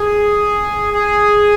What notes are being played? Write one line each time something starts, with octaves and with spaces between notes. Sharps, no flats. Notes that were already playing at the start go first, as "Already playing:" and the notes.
Already playing: G#4
G#4